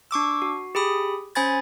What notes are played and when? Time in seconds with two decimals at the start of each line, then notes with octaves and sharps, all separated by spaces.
0.11 D4 C#6 D6 E6
0.42 F#4
0.75 G4 G#4 B5 D#6
1.35 C#4 C5 G#5 B5 G#6 A6